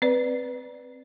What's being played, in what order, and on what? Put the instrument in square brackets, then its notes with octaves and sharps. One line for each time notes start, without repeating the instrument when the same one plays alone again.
[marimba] C4 B4 D5